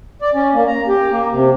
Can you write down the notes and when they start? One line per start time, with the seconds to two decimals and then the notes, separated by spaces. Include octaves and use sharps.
0.22 D5
0.34 C#4
0.54 A#3
0.67 A#5
0.88 G4
1.11 A#3
1.31 C3